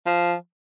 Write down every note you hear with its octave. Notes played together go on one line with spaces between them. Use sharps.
F3